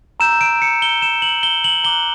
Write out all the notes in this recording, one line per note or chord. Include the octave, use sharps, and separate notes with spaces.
A#5 E6 G6 E7
D7
C#7
G7
E7
F#7
G7
F#7
A#5 D6 F#6 G7